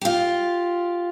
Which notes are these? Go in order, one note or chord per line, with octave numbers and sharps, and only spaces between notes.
F4 G4